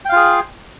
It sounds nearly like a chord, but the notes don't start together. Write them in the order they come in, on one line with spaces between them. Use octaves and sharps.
G5 F5 F4 G#4